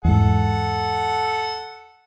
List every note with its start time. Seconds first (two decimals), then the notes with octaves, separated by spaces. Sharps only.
0.05 E2 G#2 A4 F#5